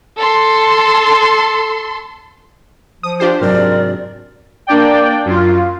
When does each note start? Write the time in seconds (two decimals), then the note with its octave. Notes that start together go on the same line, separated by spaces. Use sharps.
0.20 A4 C6
3.03 F3 D#6
3.20 D4 F4 G4 C5
3.41 G#2 C3 F#3 A#4 D5
4.67 A#3 D4 D5 G5
5.25 F#2 F4